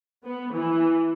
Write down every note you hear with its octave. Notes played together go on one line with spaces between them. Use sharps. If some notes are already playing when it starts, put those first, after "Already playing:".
B3
E3